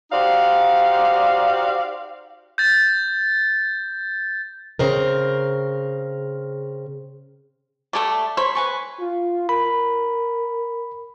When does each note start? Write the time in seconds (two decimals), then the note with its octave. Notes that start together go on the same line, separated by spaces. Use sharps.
0.12 D#4 F#4 G4 C5 D5 F5
2.58 G6 A6
4.79 C#3 C4 A#4
7.93 F#3 G3 A3 A4 D5
8.37 C5 C#5 B5
8.55 B4 G#5 C#6
8.99 F4
9.49 A#4 B5